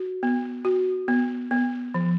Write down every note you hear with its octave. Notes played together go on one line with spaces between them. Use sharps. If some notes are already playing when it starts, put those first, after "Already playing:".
Already playing: F#4
B3
F#4
B3
B3
F3